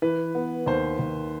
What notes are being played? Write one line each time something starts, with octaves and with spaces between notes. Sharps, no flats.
E3 B4
B3
D#2 C5
D#2